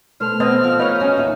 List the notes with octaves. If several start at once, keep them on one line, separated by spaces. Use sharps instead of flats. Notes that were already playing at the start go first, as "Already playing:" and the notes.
B2 A3 C5 F6
B3 C4 D#5
F3
D#4 B4 C#5
C#4 F#4
D#2 A#2 E5